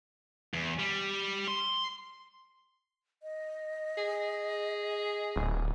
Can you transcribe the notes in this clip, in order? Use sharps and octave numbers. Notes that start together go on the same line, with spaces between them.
E2
G3
C6
D#5
G#4
D1